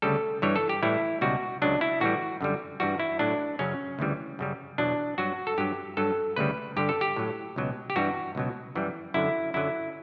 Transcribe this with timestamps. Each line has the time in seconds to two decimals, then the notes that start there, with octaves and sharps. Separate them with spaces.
0.02 D2 C#3 G3 A4
0.42 G2 E3 G3 C#5
0.56 A4
0.69 G4
0.83 A2 E3 G3 E4
1.21 C#2 B2 G3 F#4
1.62 C#2 C#3 F#3 D4
1.81 E4
2.00 A2 E3 G3 F#4
2.41 F#2 D3 G3
2.80 G2 E3 G3 F#4
3.00 E4
3.19 A2 F#3 D4
3.59 F#2 C#3 F#3 C#4
3.99 D2 C#3 E3 G3
4.39 F#2 C#3 G3
4.78 E2 B2 F#3 D4
5.18 G2 F#3 F#4
5.47 A4
5.58 G2 F#3 G4
5.97 G2 F#3 A4
6.36 D2 C#3 G3 B4
6.77 G2 D3 G3 G4
6.89 A4
7.01 G4
7.16 A2 F#3
7.56 C#2 B2 F#3
7.90 G4
7.96 G2 E3 G3 F#4
8.35 C#2 B2 F#3
8.75 F#2 E3 G3
9.14 F#2 D3 F#3 E4
9.54 F#2 D3 F#3 E4